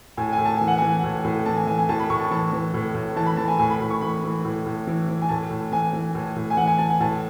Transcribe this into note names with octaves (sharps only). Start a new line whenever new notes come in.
A2 G#5
G#5
A2
A5
E3 G#5
F#5
E3 G#5
A2
A2
E3 A5
G#5
E3 G#5
G#5
A2 A5
B5
A2 C#6
A5
E3 A5
E3
A2
A2
E3 A5
B5
E3 A5
G#5
A2 G#5
B5
A2 B5
C#6
E3 B5
E3
A2
A2
E3
E3
G#5
A2 A5
A2
E3 G#5
E3
A2
A2
G#5
E3 F#5
G#5
E3 A5
G#5
A2 A5